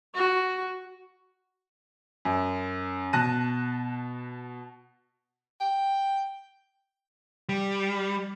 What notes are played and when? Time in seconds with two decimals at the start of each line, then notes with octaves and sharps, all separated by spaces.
0.15 F#4
2.25 F#2
3.13 B2 A5 F#6 A#6 D#7
5.61 G5
7.49 G3